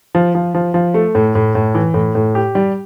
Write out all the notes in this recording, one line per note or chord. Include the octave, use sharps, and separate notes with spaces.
F3
F3
F3
F3
A3
A2
A2
A2
E3
A2
A2
G4
G3